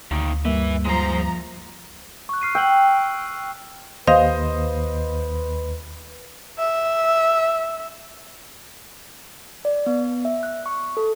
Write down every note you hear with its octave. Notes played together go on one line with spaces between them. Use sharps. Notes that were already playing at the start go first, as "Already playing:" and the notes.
D2 A#2 D#3
G2 G3 A#3 B4 E5
F3 G#3 C5 A#5
C#6 F#6
F6 C7 D#7
G5 E6 F#6 F#7
D#2 B4 C5 D#5 F5
E5
D5
B3
E5
F#6
C#6
A4